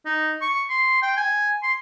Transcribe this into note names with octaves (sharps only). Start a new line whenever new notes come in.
D#4
C#6
C6
G5
G#5
C6